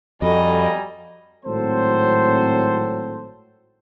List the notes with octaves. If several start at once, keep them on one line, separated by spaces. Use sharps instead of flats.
F2 G3 F#4 A4 D#5 G#5 A#5 B5
G#1 A2 F#3 C4 A4 C5